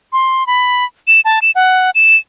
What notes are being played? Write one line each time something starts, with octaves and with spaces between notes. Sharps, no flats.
C6
B5
E7
A5
E7
F#5
E7